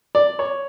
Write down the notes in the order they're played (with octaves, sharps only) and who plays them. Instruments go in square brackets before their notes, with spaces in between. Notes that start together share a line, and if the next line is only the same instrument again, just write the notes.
[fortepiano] D5
C#5